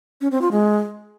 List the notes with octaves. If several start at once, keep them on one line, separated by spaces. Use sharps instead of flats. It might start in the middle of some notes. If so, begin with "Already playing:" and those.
C#4
C4
F4
G#3